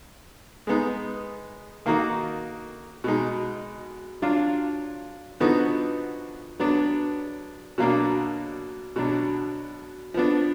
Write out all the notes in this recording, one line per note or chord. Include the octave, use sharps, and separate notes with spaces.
G#3 B3 D#4
D#3 A#3 D#4 F#4
B2 G#3 D#4
F#3 D4 F4
D3 F3 B3 D#4 F#4
F#3 B3 D4
B2 F#3 A#3 D4
B2 F#3 D4
F3 B3 D4